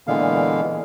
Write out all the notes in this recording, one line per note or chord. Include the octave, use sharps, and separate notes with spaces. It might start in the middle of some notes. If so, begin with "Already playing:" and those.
A#2 D3 E3 G#3 B3 F5